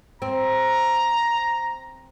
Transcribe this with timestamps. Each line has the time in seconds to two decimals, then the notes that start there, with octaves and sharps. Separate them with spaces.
0.22 C4 A#5